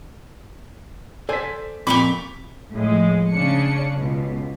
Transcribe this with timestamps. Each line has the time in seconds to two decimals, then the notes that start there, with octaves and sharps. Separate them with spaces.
1.29 A4 C5 D5 G#5 B6
1.87 F2 A#2 G4 B5 C#6 D6 F#7
2.73 A2 F3 G#3
3.32 C#3 C#4 D4 C#7
3.94 C#2 B2